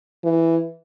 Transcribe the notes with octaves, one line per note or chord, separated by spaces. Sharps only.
E3